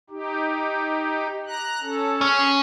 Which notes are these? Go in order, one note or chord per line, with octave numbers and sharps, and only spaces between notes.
D#4 G4
A#5 F#6
C#4 A4
C#4 G#4